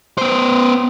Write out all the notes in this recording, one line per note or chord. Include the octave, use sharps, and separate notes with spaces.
B3 C5